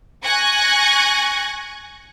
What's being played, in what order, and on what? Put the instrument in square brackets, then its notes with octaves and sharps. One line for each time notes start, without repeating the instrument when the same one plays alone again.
[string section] G#5 C#6 F#6 G#6 A#6